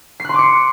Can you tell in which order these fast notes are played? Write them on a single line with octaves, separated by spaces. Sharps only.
C7 F#6 C6 D6 C#7